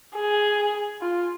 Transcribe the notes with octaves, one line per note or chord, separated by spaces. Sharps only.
G#4
F4